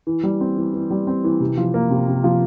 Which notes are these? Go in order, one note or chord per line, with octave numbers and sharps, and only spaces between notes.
E3
G3
C4
E3
E3
G3
C4
E3
C3
F3
A#3
C3
C3
F3